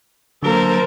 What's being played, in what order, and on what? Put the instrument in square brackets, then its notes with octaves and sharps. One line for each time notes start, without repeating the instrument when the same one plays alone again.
[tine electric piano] D3 F#3 A#3 [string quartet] A4 A#4 C5